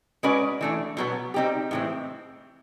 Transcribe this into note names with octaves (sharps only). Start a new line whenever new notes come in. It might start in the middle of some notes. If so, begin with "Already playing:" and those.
G#3 C#4 F#4 B4 D5
E3 A3 D4
B2 F#3 B3
G3 C4 D#4 G4
A2 E3 G#3 C4